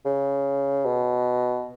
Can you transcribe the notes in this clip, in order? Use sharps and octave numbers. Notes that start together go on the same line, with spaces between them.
C#3
B2